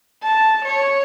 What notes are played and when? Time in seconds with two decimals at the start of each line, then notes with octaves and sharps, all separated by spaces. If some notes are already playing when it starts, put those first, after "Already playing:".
0.23 A5
0.65 C#5